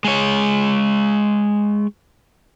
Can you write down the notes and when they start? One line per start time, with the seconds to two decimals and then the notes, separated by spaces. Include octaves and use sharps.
0.04 G#3 C#5